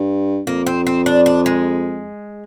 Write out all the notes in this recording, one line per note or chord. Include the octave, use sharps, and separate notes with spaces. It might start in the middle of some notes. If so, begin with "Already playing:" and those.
Already playing: G2
F2 A#3
C4
C4
D4
D4
G#3